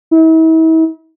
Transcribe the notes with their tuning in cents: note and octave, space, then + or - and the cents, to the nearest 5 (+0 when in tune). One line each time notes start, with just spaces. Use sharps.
E4 -40